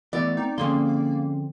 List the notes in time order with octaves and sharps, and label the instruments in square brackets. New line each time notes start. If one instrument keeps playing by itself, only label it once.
[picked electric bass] E3 [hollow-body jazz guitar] A3 B3 [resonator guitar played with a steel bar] D5
[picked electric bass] C4 [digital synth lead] D#4
[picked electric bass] D3 F3 C4 [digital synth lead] A#3 [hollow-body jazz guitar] C#4 G#4 C6